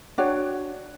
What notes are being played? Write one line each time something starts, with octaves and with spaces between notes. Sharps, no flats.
D4 F#4 C#5 G5